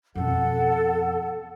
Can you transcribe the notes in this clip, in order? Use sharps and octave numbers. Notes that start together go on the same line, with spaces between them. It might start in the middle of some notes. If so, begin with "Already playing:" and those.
F2 B2 A4 F#5